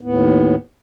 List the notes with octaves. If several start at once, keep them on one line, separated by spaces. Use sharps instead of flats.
D#2 A2 B3